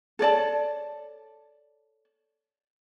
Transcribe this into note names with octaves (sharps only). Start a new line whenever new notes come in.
A4 C#5 D5 A5